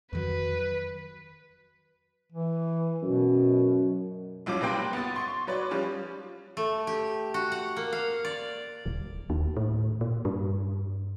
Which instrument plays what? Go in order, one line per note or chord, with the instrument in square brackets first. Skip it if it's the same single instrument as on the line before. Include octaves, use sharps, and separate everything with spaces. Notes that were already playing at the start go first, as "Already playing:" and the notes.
[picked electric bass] F2 D#3 F#3 [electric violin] B4
[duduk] E3
[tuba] F#2 [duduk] B2
[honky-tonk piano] C2 F#2 F3 C#4 D6
C3 A#3 B4 G5 C6
B3 A6
C6 C#6
F#3 B4 C#5 D5
F3 G3 C#4
[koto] A3
G4
F#4
F#5
A#3
F5
D5
[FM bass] D#1
D#2
A2
A#2
G2